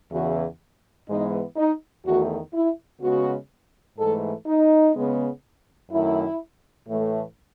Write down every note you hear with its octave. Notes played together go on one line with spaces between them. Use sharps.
E2 C#3 E3 F#4
G#2 E3 G#3 B3 D#4
D#4
E2 D#3 A3 F#4
E4
C#3 G#3 B3 F#4
G#2 E3 A3 A4
D#4
C#3 G#3 B3
F#2 D#3 A3 E4
A2 E3 A3